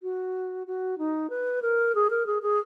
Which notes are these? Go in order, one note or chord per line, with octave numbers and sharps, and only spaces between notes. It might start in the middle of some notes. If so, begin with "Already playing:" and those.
F#4
F#4
D#4
B4
A#4
G#4
A#4
G#4
G#4